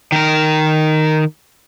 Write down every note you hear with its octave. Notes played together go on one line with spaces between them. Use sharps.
D#3 A#4